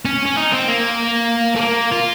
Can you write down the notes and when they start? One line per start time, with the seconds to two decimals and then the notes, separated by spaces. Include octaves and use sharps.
0.05 C#4
0.25 C#4
0.37 D#4
0.53 C4
0.68 A#3
1.56 A3
1.60 A#3
1.92 F4